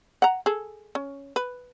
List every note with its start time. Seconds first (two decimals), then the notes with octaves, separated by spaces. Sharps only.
0.22 F#5 A#5
0.46 G#4 A4
0.95 C#4
1.36 B4